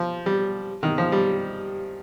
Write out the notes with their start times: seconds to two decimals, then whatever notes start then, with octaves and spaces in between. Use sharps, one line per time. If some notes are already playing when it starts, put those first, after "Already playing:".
Already playing: F3
0.26 G3
0.83 D#3
0.98 F3
1.12 G3